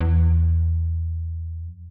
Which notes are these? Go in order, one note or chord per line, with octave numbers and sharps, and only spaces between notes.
E2
F2